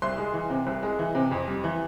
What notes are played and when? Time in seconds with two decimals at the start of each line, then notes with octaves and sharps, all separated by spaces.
0.02 C2 C6
0.18 G#3
0.33 E3
0.50 C3
0.67 C2
0.83 G#3
0.99 E3
1.15 C3
1.31 F2
1.48 G3
1.64 E3